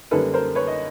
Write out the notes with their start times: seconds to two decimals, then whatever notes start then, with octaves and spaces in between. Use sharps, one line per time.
0.11 F#2 D3 G3 A#3 D4 A4 B4
0.34 A#4 C5
0.55 B4 C#5
0.68 D#5